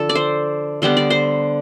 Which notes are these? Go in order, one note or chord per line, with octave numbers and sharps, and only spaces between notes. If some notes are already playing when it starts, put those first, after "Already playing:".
Already playing: D3 F3 A4
D5
C5
D3 G3 B3 C5
D5
C5